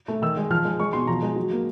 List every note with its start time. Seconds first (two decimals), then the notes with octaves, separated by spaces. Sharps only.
0.08 A3
0.22 D#3 E6
0.37 G#3
0.50 F3 F6
0.65 G#3
0.80 G#3 C#6
0.93 B2 C6
1.07 F3 A#5
1.22 G#3
1.36 F#3
1.51 A#3